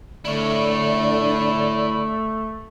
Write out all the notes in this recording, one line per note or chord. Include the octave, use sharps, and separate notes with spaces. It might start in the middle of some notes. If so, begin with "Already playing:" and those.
D3 A3 E4 C#5 D5